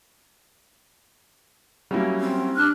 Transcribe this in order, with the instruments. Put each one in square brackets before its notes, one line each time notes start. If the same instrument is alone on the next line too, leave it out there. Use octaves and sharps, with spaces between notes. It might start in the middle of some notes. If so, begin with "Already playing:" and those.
[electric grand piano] F#3 C#4 E4 [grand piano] G3 A#3
[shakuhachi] C4
[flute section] D4 F6 F#6